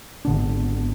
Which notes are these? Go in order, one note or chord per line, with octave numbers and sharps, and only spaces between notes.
G#1 D3 B3 D4